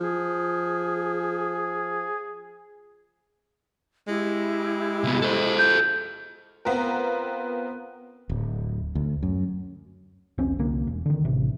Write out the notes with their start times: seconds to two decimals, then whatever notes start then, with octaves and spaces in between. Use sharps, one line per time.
0.01 F3 G#4
4.08 G#3 E4 G4
5.04 C2 B3
5.22 A4 C5
5.59 G6
6.65 B3 C4 F4 A#4
8.29 D1
8.95 D2
9.23 F#2
10.38 E1 B1 C4 C#4
10.59 C2 D3 A#3
10.87 E1
11.06 D3 D#3
11.25 A1 C3